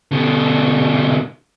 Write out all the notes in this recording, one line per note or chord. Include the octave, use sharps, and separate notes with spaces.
B2 D3